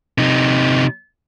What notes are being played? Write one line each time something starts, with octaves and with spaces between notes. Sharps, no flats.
C3 D#4